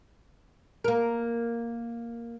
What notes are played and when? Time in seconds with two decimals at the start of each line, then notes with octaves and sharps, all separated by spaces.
0.84 A#3 A#4